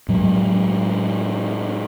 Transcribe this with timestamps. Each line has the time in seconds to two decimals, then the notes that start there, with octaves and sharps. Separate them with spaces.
0.09 A2 F#3 G#3